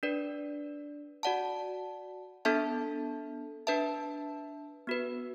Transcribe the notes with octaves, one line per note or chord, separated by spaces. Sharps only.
D4 B4 D5
F#4 D5 F#5 A5
B3 D4 A4 E5 A5
D4 B4 E5 A5
B3 F#4 B4